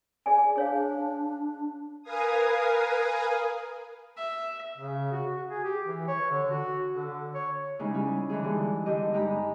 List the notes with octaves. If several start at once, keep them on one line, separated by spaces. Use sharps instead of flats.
G#4 D5 G#5
D4 G#4 C#5 F5
A#4 B4 F5 G#5 D#6
E5
C#3
F#4
F#4
G#4
G4
E3
C#5
D3
F#4
D3
C#5
C#3 G3 G#3 D#4 E4
G3 C#4
D3 E3 D#4 G#4
G3 G#3
D3 G3 G4 D#5
G2 G#3 D#4 G4 A#5 B5